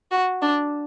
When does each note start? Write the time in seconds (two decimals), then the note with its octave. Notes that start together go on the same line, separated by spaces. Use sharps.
0.11 F#4
0.42 D4